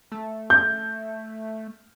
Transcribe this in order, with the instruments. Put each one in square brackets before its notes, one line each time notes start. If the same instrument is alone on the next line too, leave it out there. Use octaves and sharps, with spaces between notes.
[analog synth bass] A3
[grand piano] G6